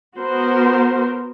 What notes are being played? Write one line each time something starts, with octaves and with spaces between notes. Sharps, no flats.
B3 F#4 A#4 C5